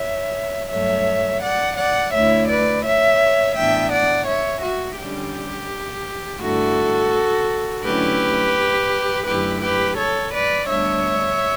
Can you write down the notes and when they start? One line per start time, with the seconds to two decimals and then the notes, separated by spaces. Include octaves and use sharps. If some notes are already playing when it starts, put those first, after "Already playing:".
Already playing: C#5 E5
0.72 G2 F#3 A3 C#5 E5
1.43 D5 F#5
1.79 D5 F#5
2.14 D2 D3 A3 E4 C#5 E5
2.50 B4 D5
2.85 C#5 E5
3.56 A2 E3 B3 D4 E5 G5
3.92 D5 F#5
4.28 C#5 E5
4.64 F#4
4.99 D3 G3 C#4 G4
6.41 G2 D3 A3 E4 F#4 A4
7.84 D3 F#3 A3 C#4 E4 G4 B4
9.27 F#2 D3 A3 E4 G4 B4
9.62 G4 B4
9.98 A4 C#5
10.34 B4 D5
10.69 D2 D3 G3 B3 D4 C#5 E5